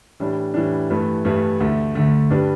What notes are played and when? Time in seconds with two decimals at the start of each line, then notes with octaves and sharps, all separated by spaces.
0.20 A2 E3 G3 D4
0.54 A2 E3 G3 D4
0.90 G2 E3 A3 E4 B4
1.25 G2 E3 A3 E4 B4
1.60 D2 D3 A3
1.95 D2 D3 A3
2.30 G2 G3 D4 B4